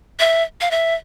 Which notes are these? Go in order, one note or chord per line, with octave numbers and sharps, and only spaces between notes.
E5
F5
E5